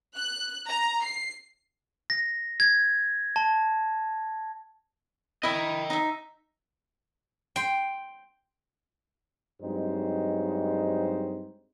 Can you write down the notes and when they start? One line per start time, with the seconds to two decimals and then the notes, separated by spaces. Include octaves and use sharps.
0.17 F#6
0.69 A#5
1.05 C7
2.10 A#6
2.60 G#6
3.36 A5
5.43 E4 D#5 E5 G5
5.90 D#4 E5
7.56 G5 C6
9.62 G2 F#3 G#3 C4 D#4 C5